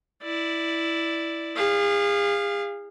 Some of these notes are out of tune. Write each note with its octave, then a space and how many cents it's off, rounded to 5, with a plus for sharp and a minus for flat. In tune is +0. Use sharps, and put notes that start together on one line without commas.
E4 +0 D5 +0
G#4 -35 F5 +0